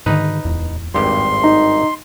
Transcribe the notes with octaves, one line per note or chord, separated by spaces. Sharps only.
G#2 D3 D#3 D#4 B4
D1 E2
G#1 G2 G4 C6
D#4